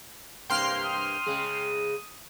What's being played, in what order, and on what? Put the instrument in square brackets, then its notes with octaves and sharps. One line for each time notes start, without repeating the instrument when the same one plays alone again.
[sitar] G2 C3 A#3 [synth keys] G5 C6 F6
[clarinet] D#6
[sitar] C#3 G#3 G#4